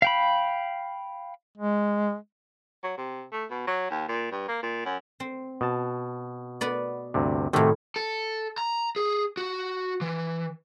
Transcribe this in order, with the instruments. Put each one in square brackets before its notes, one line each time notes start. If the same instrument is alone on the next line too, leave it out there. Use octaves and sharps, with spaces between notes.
[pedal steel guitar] F5 G5 B5
[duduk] G#3
[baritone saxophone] F#3
C3
A3
B2
F#3
D#2
A#2
G2
A#3
A#2
F#2
[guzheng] C4
[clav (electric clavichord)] B2 A5
[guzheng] B3 B4 D5
[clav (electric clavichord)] D2 G2 C3
[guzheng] A2 D#3 [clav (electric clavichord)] C3 A3 F#4
[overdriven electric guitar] A4
A#5
G#4
F#4
E3